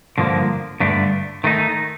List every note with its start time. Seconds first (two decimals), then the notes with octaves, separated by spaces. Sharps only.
0.18 G2 D3 F3 A#3
0.80 G2 D3 A3 D4
1.44 D#3 A3 D#4